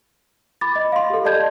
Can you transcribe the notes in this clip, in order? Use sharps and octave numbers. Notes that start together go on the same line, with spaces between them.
B5 D6 A6
D#5
F5 C6
G4 A4
D5 D#5 A5 G6 G#6